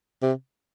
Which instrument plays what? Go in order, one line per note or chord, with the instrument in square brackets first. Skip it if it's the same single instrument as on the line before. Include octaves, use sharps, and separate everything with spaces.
[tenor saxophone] C3